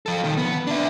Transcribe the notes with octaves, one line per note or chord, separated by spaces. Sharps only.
F3 A4
A#2 D#3
B3
D4 E5